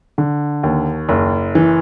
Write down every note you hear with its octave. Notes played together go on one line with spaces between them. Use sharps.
D3
D#2
F#1
E3